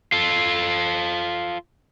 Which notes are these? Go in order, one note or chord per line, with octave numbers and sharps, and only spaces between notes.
F4 A4